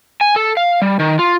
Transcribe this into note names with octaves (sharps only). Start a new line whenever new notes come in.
G#5
A4
F5
G3
D#3
F4